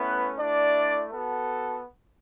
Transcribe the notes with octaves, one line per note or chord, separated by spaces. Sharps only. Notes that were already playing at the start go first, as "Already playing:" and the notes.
Already playing: A3 B3 C#4 E4 B4
A3 D4 E4 D5
B3 F#4 A4